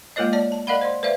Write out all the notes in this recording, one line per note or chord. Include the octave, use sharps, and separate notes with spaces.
G#3 A#3 F4 A#4 C#5 D#5
C#5 D5 A5
A5
A#4 D5 D#5 F5 F#5 B5
C5 D5 C6
B4 C5 D5 E5 F5